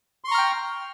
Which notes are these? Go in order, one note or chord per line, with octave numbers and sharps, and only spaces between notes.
G5 A#5 C6 C#6 F6